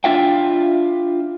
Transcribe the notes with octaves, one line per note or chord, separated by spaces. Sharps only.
D4 F4 E5 F5 G5